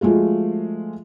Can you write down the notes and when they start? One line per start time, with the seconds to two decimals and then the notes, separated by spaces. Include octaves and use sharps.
0.01 F3 G#3 A3 F4 F#4